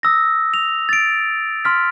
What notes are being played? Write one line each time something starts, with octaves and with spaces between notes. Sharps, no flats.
D#6 E6 A#6
F7
A6 D7
C6 F6 B6